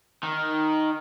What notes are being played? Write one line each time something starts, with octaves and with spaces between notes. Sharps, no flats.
D#3